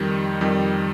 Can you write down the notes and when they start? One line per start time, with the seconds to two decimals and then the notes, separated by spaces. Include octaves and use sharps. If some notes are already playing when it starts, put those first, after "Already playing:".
Already playing: F2 D#3 G3
0.41 F2 D#3 G3